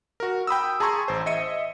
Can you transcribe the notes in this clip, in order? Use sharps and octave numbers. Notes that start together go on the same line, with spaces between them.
F#4 A#4
G5 B5 D#6 E6
G#4 A5 A#5 C6 C#6 G#6
A1 C5
D#5 E5 C#7 D#7